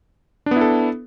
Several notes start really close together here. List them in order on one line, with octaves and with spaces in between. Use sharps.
D4 B3 E4 A4